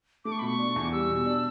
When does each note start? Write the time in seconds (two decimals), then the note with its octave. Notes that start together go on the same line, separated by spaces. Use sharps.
0.25 A3 D6
0.32 C#6
0.39 B2 B5
0.47 C#6
0.59 D4
0.76 E2
0.84 D6
0.92 G3 E6
1.09 B2
1.26 D4